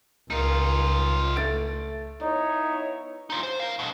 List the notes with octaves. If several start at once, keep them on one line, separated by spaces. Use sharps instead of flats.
C#2 D#4 F4 A#4
A3 A6 D7
B3 D#4 E4 C#5
D#4 F4
C5
A#4 F5
B2 D3